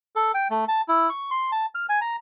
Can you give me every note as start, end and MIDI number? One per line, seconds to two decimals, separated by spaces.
0.16 0.32 69
0.34 0.48 79
0.50 0.65 57
0.68 0.81 81
0.88 1.09 64
1.10 1.30 85
1.31 1.51 84
1.52 1.66 81
1.75 1.86 89
1.89 2.00 80
2.01 2.16 82